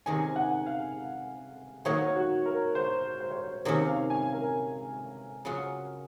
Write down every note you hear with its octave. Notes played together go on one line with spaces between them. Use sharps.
C3 D#3 G#3 C#4 G#5
F#5
F5
D#3 F#3 A#3 D#4 C#5
F#4
A#4
C5
C5
C#5
C5
C3 D#3 A#3 C#4 C#5
F5
G#5
A#4
C#3 F#3 C#4 F4